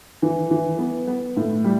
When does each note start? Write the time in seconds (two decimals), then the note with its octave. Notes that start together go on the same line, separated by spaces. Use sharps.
0.22 E3
0.51 E3
0.78 B3
1.07 B3
1.36 A2
1.64 G3